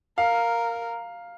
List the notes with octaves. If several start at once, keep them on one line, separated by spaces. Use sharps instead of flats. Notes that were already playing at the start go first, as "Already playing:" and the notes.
A#4 F5